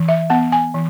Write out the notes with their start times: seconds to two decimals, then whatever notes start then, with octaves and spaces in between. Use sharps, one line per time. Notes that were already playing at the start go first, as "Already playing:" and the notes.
Already playing: E3
0.09 E5
0.30 B3 F#5
0.52 G#5
0.74 E3